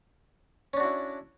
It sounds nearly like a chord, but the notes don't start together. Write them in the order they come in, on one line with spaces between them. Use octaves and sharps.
C#4 D4 F#4 E4